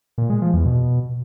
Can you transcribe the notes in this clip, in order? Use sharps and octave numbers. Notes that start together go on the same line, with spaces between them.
A#2
G#3
F3
E2
B2